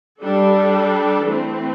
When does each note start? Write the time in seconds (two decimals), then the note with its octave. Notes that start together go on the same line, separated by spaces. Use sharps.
0.21 G3 D4 A4
1.24 E3 A3 C4